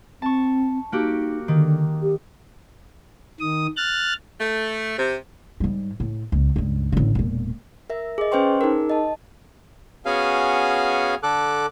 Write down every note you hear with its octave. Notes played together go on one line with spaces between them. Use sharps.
C4 A5 C#6
A#3 D#4 F#4 G4
D3 D#3
G4
D#3 D#6
F6 F#6 A6
A3
C3
G#2 G3
A2
C#2
C#2 G2
A1 D3
E1 A#2
A#4 E5
G#4 D#5
C#4 B4 C5 G5 C6 C#6
D#4 G#4 A#4
D#5 A5
B3 C#4 F#4 G#4 F5 G#5
D3 A4 D6 F#6